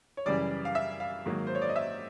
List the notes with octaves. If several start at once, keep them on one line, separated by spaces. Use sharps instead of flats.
C#5
F#2 C#3 E3 G3 D5
F5
E5
F5
G#2 D#3 F#3 A#3
C5
C#5
D5
D#5
E5